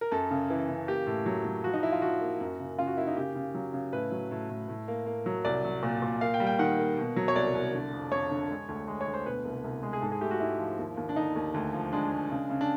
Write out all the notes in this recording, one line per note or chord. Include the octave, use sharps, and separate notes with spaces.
A#4
F#2 A4
C#3
E3
C#3
A#3 G4
A2
F#3
F#3
F3 F#4
D#4
F3 E4
F4
F3 F#4
A#3
F#2
C#3
C#3 F4
F#4
A#3 E4
D#4
C#3 G4
C#3
F#3
C#3
A2 B4
F#3
A2
A2
A2
A#3
A#3
F#3
C2 D5
F#3
A#2
A#2
A#3 F5
G5
G3
G5
D#3 F#5
A#3
B2
F#3
C#5
C2 D5
C2
D3
F2
F2 C#5
D3
G#3
D2
G#3
C#5
D2
C5
B2 B4
C2
C2
G#3
G#4
G#2 A4
G#4
A3 G4
F#4
G#2 E4
F3
D#2
D#2
D4
D3 D#4
D#2
D2
F3
G#3 D4
G#3
C#3
C#3
D4